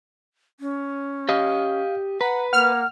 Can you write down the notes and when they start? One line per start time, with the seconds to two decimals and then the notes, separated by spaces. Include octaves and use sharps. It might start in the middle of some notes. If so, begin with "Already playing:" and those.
0.60 C#4
1.29 G4 D#5 F5
2.21 B4 F#5 A#5
2.53 A#3 F#5 F6